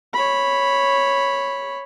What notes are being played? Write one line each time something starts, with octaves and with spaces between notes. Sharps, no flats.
C#5 B5